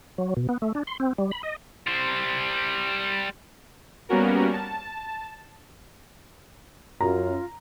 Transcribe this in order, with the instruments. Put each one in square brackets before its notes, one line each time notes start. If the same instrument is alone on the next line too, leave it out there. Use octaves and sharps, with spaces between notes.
[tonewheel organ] F#3
B2
B3
A3
D4
C6
C4
G3
B5
D#5
[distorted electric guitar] G3 C5
[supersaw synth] G3 A#3 B3 C#4 F#4 A#4
A5
[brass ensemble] F#2 [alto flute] F4 [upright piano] A#5